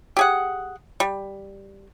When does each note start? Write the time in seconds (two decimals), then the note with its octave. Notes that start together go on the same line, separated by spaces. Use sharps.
0.17 G4 G#4 F#5
1.00 G3